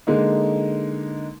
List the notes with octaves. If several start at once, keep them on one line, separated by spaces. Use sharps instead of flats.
D3 G#3 A#3 D#4